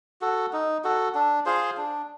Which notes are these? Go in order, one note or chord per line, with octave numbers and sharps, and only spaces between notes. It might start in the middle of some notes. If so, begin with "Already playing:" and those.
F#4 A4
D#4
F#4 A4
D4
F4 G#4 C5
D4